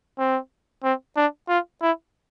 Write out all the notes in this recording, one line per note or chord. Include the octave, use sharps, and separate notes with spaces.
C4
C4
D4
F4
E4